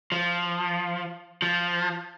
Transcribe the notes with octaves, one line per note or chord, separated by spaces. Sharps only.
F3
F3